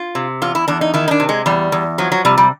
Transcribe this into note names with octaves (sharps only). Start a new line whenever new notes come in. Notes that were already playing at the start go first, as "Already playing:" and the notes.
Already playing: F4
C3
E2 F4
E4
E2 D4
D#4
D#3 E4
D#4
D4
C3
G#3
E2 G3
E2
F3 F#3
F#3
C3 G3
G3